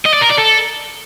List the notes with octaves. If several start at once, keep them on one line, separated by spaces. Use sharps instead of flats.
D#5
D5
A#4
D5
A4